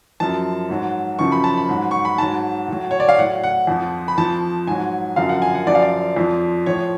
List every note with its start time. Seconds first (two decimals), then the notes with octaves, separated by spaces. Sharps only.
0.20 F#2 F3 A5
0.69 G#2 F#3
1.19 F#2 C#3 F3 C#6
1.32 B5
1.44 A5
1.57 B5
1.69 G#2 F#3
1.91 C#6
2.05 B5
2.18 G#2 F#3 A5
2.68 A2 F#3
2.91 C#5
3.00 D5
3.09 F5
3.18 A2 F#3 F#5
3.44 F#5
3.67 F2 F3
4.08 B5
4.18 F2 F3 A5
4.67 G#2 F#3 G#5
5.16 F#2 D3 F3 F5
5.29 F#5
5.42 G#5
5.55 F#5
5.67 F#2 F3 D5
5.75 F5
5.83 D5
6.16 F2 F3
6.66 A2 F3 C#5